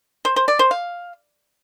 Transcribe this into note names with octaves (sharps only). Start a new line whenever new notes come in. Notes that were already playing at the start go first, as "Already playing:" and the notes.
C5
C5
D5
C5
F5